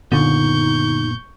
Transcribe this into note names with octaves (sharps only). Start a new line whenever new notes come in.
F#1 A#2 D3 B3 D#4 C#6 G6